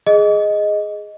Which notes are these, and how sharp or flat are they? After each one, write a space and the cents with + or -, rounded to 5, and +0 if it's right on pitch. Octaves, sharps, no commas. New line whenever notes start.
G#4 +0 D#5 +0